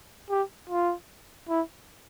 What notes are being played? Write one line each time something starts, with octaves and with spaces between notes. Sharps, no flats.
G4
F4
E4